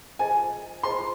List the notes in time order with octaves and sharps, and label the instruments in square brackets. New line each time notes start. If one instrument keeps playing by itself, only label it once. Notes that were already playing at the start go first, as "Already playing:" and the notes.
[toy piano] F4 G#4 C5 D#5 [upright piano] G#5
[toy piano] F4 G#4 C5 D#5 [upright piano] C6